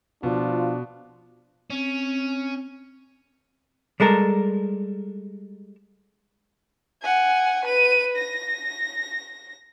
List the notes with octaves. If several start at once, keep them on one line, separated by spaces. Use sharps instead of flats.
B2 F3 D4 F4
C4 C#4
G3 G#3 A4 A#4
F#5 G#5
B4 D#7
A#6